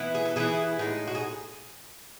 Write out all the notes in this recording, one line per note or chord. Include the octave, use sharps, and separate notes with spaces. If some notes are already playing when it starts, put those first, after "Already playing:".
Already playing: E3 B3 E4
G#4
A4
E3 B3 E4 G#4
A2 G#3 D#4
F#4
G#4